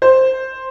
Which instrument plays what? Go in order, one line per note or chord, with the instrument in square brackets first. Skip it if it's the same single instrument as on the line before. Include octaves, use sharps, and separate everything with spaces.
[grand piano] C5